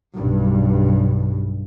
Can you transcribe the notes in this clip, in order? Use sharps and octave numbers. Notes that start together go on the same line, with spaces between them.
B1 G2